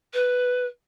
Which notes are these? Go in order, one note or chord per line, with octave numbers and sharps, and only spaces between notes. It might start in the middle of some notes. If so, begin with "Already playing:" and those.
B4